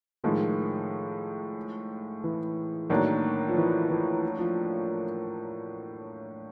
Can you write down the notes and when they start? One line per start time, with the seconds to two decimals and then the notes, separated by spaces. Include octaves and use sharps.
0.24 A2 D#3 F3 G#3
2.24 E3
2.90 A2 D#3 F#3 A#3 D4
3.49 F3
3.57 E3
3.89 E3
4.39 F3